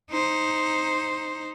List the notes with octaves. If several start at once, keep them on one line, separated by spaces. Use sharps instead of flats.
D#4 C5